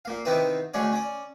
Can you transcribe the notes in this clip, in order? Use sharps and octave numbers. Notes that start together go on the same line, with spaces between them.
A#2 A#3 F5
C3 D#3 B3 C4 E4 B4
D2 G#3 A3 C#4 C#5 D5
C#4 D5